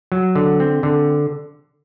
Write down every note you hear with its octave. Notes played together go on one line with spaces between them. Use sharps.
F#3
D3
C4
D3